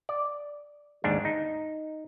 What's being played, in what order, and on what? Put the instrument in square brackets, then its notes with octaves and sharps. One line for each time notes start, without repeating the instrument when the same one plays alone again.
[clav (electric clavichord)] D5
D#2 G#2 D4
D#4